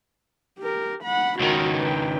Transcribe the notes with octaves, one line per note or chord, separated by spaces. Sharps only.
G4 A#4
F#5 B5
C#2 D#3 F#4 A#4
B4 G5